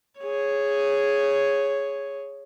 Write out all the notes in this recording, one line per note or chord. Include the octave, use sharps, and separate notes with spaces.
G#4 C#5